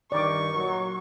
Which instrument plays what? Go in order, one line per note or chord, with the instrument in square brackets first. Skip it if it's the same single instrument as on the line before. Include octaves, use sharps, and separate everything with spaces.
[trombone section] G2 D#3 [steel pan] D5 D6 [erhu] C#6
[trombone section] A#2 F#3